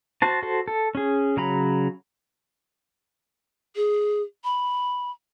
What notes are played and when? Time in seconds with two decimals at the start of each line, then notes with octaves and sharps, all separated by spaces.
0.22 F#4 C5 A5
0.43 F#4 A4 C5
0.68 A4
0.95 C#4 G#4
1.37 C#3 F#3 A#5 B5
3.76 G#4
4.44 B5